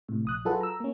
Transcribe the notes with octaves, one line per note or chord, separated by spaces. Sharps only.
A2 C3
A#1 D#6 F#6
F#3 F4 G#4 A4 B4 F#5
A#5 E6
A#3 C#4